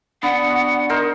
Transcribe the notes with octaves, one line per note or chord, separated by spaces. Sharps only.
B3 D4 F#5
F#4
D#4 A#4 C5